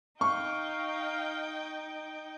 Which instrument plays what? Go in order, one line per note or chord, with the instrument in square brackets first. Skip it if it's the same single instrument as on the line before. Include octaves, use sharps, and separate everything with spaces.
[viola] D#4 G5 [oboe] F5 [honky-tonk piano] C#6